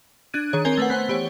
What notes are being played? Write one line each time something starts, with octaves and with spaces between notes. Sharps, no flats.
D4 F#6 G#6 D#7
D#3 G#4 C#5
C4 A#4 C#5 G#5 G#6 G7
A3 B4 F#5
B3 C5 F#5
E3 G4 C5 C#5